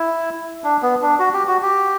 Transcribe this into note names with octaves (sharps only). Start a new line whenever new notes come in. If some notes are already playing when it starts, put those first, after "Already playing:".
Already playing: E4
D4
B3
D4
F#4
G4
F#4
G4